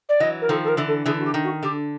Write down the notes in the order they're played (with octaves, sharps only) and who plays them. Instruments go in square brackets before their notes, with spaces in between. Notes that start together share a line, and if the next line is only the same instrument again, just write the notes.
[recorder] D5
[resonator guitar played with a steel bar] E3 F#3 [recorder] D#5
[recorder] A#4
[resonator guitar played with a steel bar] D#3 F3 [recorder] A4
[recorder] A4
A#4
[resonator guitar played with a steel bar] D3 E3
[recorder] A4
[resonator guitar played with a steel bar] D3 E3 [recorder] G#4
[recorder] F#4
G4
[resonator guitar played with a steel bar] D#3
[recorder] F#4
[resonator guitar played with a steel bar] D3 [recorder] G4